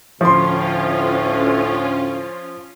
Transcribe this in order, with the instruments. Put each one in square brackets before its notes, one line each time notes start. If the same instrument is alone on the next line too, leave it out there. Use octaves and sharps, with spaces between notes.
[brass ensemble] D2 A2 [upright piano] F3 C6 [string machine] C#4 F4